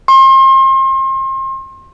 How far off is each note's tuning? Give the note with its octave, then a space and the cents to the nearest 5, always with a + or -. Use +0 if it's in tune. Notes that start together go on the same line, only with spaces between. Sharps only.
C6 +35